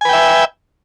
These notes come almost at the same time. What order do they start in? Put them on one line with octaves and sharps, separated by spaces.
G#5 B4 G5 E5